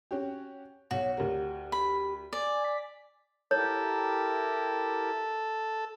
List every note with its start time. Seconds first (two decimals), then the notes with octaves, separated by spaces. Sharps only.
0.11 C#4 F#4 G4
0.91 B1 F#4 C#5
1.17 D2 G4 A#4
1.72 B5
2.33 D5 G#5
2.64 B6
3.51 E4 G4 A4 A#4 C#5